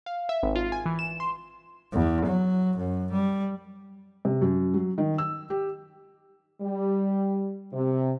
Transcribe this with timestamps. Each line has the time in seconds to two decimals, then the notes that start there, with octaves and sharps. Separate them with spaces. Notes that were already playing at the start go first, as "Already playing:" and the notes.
0.06 F5
0.29 E5
0.43 G#1
0.56 F4
0.72 G#5
0.86 E3
0.99 E7
1.20 C6
1.93 E2
2.26 F#3
2.78 F#2
3.12 G3
4.25 C3
4.41 F#2
4.74 F#3
4.98 D#3
5.18 E6
5.50 G4
6.61 G3
7.73 C3